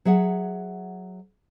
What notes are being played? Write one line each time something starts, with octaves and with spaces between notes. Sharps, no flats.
F#3 G#4 E5 F#5